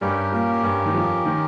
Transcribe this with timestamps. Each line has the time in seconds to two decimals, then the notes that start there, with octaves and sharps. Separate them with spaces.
0.01 G2 G3 C#4 G4 A#4
0.32 A#2 A#3
0.63 G2 G3
0.86 D#3
0.94 F2 F3
1.25 D#3